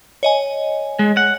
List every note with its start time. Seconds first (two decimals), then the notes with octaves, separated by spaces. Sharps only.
0.23 C#5 D#5 G#5
0.99 G#3
1.17 F#5